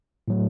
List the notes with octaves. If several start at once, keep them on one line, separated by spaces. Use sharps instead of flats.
A2 F#3 A3